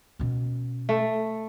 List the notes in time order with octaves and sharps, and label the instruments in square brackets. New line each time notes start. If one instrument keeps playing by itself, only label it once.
[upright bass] B2 C#4
[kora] A3